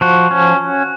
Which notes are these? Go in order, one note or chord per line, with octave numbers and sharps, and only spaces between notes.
F3 F#4
C#4